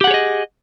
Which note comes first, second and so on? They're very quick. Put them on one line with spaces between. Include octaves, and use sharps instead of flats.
G4 F#5 G#4 C#5 D#5